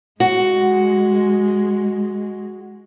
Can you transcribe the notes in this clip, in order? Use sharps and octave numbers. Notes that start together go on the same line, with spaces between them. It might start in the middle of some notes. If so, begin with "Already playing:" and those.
G#3 F#4